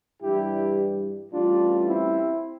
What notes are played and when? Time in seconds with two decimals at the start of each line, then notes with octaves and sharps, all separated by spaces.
0.22 G2 E3 G3 E4 G4
1.31 A1 A2 G3 D4 F4
1.86 C4 E4